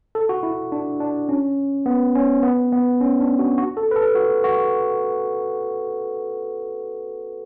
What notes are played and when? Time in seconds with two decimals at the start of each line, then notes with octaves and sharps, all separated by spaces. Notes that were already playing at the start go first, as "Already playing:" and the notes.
0.15 A4
0.29 F#4
0.43 E4
0.72 D4
1.00 D4
1.29 C#4
1.86 B3
2.15 C#4
2.43 B3
2.72 B3
3.01 C#4
3.20 D4
3.39 F#4
3.58 F#4
3.77 A4
3.91 B4
3.96 A4
4.15 F#4
4.44 F#4